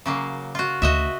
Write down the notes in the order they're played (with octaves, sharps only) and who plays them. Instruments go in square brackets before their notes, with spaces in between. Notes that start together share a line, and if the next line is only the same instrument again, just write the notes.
[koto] C#3 F#3 A#3
F4 F#4
[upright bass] D2 [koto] F#4 D#5 E5